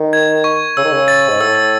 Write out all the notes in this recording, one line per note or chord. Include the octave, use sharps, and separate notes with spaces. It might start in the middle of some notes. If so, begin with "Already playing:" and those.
Already playing: D#3
G#6
C#6
C#3 E6
D#3
C#3
A6
G#2
A2 E6